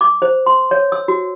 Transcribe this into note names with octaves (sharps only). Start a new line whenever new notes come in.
D6
C5
C6
C#5
E6
F#4